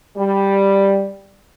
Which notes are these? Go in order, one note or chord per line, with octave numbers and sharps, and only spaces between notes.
G3